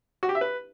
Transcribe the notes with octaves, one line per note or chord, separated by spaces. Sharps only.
F#4
G4
E5
B4